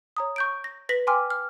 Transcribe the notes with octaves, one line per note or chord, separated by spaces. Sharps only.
C#5 A#5 D#6
C#6 G6 D7
A#6
B4 A#6 B6 F#7
G5 G#5 C6 D6 F6
F6